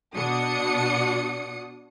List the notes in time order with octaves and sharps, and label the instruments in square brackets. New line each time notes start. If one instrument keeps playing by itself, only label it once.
[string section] B2 D4 F#4 D#6 C#7